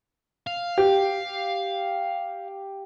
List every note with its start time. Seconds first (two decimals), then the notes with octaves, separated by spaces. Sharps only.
0.47 F5
0.78 G4